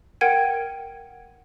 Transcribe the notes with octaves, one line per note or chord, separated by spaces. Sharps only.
A#4 F#5 G5 G#6 D7 D#7